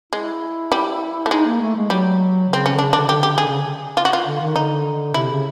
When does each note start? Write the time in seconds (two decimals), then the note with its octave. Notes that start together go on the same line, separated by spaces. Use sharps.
0.13 G#3 E4
0.72 G3
1.26 A3
1.31 G#3 D#4
1.46 A#3
1.61 A3
1.76 G#3
1.90 F#3 G3
2.49 C#3 C4
2.66 C#4
2.74 D3
2.79 C#3 D4
2.93 D3 D4
3.08 D3 G4
3.23 D3 G4
3.37 D3 G#4
3.47 C#3
3.97 F4
4.05 F#4
4.13 F4
4.26 D3
4.40 D#3
4.56 D3 D#4
5.14 C3 E4
5.30 C#3